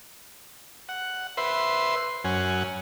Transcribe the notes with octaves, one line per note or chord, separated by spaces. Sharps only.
F#5
B4 C5 E5 C6
F#2 C#4 F#5 G#5